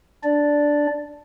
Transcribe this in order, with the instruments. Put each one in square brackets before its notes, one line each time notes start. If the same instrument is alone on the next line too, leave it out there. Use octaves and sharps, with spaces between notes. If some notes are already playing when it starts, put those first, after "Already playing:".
[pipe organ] D4 D5